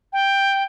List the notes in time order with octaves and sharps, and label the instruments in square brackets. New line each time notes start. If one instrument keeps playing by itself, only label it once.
[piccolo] G5